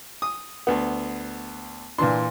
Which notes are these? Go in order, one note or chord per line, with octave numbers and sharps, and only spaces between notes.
D#6
D2 B3
A#2 E3 D4 C6